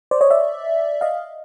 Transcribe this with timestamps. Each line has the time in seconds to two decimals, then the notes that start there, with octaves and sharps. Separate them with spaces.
0.11 C5 D5
0.21 C#5 D#5
0.31 D5 E5
1.01 D#5 F5